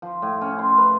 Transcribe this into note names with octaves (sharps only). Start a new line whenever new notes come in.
F3
A2
C#4
C6
B4